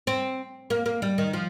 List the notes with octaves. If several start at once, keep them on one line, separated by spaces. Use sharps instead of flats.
C4
A#3
A#3
G3
D#3
F3